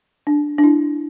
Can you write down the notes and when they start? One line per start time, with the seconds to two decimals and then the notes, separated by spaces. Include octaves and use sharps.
0.27 D4
0.58 D4
0.64 E4